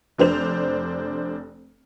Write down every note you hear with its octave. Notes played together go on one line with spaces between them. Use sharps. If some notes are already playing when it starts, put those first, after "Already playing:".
F1 D4 C5 F7